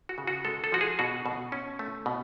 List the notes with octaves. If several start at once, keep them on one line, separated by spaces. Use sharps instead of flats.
F#4
C#3
F#4
G#3 A4
A4
F3 F#4
G#4
B2 F#4
B2
C#4
A3
B2